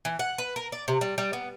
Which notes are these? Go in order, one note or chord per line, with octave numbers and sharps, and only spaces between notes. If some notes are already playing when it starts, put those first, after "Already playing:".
E3
F#5
B4
A#4
D5
C3
G3
G3
B3